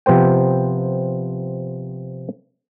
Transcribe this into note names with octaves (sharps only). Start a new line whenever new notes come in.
C3 F3 B3 C5 G5